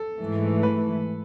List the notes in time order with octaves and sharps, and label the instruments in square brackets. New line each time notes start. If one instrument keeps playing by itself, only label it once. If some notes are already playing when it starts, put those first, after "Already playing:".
Already playing: [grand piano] A4
[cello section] G#2 E3 A3
[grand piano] B4